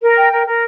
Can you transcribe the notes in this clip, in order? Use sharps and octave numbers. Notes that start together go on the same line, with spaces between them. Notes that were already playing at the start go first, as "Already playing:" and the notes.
A#4
G5
A#4
A#4